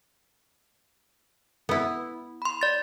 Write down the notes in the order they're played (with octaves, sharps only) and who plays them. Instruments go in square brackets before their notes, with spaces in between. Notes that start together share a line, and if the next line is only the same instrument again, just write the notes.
[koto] B3 E4
[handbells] B5 C6
D5 A6